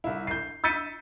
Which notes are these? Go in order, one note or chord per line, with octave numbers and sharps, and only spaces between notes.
C2 E4
G6 C7
E6 G6 A6 B6 C#7 D#7